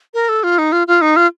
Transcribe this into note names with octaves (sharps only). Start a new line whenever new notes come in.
A#4
A4
F4
D#4
F4
F4
D#4
F4